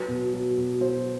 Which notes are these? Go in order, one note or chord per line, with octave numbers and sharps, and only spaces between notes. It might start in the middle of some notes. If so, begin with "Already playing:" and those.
Already playing: F#3 B4
B2
F#3
B2
F#3 C5